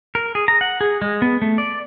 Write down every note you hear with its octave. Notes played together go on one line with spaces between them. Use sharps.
A#4
G#4
A#5
F#5
G#4
G#3
B3
A3
D5